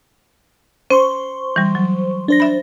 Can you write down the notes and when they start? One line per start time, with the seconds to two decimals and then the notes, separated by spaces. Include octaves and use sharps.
0.90 C#4 C5 C6 C#6
1.56 E3 G3
1.75 F#3
2.28 D4 C5 A#6
2.40 E5 B5